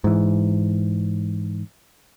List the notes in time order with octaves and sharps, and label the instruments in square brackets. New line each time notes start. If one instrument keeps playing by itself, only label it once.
[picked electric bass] G#2 E3